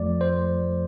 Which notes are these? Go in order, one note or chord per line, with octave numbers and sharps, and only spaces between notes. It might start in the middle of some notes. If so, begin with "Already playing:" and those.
Already playing: F2 F3 A3 D5
C5